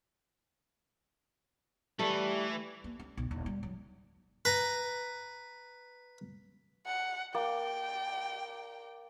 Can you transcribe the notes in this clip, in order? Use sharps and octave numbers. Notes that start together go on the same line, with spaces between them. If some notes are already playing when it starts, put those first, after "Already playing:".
E3 G3 A3
A#3
C#4
B1
D#1
G3
F#3
B4 A#5
F#5
A#3 D5 G5